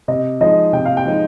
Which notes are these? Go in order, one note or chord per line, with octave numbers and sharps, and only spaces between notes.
C3 D#5
F3 G#3 D#4 D#5
C3 G5
F5
G5
F3 G#3 D#4